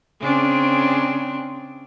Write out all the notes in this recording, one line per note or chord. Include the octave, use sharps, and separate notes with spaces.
C#3 C4 D4